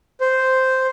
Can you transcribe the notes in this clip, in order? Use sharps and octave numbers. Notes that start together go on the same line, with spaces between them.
C5